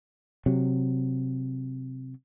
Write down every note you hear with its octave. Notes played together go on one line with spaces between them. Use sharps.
C3 F#3